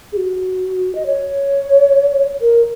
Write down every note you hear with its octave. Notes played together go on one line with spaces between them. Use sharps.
G#4
F#4
D#5
C#5
A#4